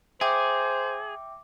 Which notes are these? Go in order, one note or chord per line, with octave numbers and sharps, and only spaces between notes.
G#4 C5 E5 G5 D6